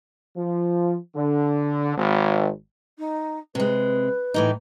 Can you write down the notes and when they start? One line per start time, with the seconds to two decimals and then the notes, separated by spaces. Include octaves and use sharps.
0.37 F3
1.15 D3
1.96 G#1
2.98 D#4
3.55 C3 G#3 B4
4.34 A2 E3 D#4